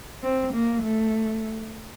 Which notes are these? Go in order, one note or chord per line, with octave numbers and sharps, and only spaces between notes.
C4
A#3
A3